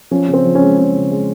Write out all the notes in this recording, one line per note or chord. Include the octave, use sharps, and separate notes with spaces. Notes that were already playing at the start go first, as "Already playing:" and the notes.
F3 C#4
C#3
C4
F3
C#4
G#3
C#3 C#4
C#3
G#3